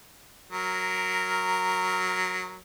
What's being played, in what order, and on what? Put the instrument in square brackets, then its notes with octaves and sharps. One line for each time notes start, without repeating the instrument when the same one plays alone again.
[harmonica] F#3 A#4